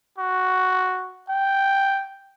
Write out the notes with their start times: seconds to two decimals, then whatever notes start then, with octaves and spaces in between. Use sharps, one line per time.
0.18 F#4
1.29 G5